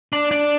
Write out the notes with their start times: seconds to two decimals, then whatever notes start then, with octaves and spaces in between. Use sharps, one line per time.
0.13 D4
0.31 D4